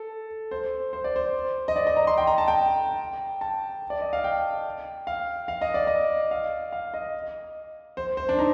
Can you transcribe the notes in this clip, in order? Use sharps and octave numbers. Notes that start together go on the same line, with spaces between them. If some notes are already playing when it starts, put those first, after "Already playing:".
Already playing: A4
C5
C5
D5
C5
D#5
D5
D#5
A#5
C6
G5
A#5
A5
G5
A5
D5
D#5
F5
G5
F5
F5
D#5
D5
D#5
F5
F5
D#5
C5
C5
D4
D#4